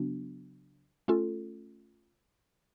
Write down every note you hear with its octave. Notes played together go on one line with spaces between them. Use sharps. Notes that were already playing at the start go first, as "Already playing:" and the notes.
Already playing: C#3 F#3 B3 D4 F#4
A3 C#4 F4 A4